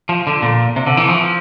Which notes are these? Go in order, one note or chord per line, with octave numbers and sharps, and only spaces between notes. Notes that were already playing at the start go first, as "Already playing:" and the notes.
F3
D3
A#2
C3
D3
E3
F3